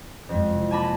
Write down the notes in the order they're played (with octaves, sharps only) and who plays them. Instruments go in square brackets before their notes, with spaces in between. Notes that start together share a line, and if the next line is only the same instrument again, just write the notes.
[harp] F2 [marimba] F#3 G#3
[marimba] C3 E4
[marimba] A#3 D6 A#6 [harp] G#5 A5 B5